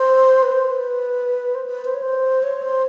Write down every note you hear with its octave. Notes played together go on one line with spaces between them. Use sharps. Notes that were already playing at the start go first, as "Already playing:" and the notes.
Already playing: C5
B4
C5
B4
C5
B4
C5
C#5
C5
C#5
C5